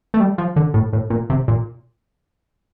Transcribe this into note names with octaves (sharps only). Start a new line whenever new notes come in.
A3
G3
F3
D3
A2
A2
A#2
C3
A#2